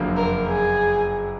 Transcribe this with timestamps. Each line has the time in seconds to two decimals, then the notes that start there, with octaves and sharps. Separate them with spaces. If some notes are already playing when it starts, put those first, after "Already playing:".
Already playing: F#1 F2 D3 F#3 A#3
0.17 A#4
0.46 G#4